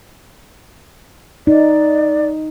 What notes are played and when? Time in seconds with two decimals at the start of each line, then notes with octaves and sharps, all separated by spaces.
1.47 D#4 D5